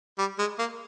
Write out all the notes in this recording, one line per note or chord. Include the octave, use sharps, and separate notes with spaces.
G3
G#3
A#3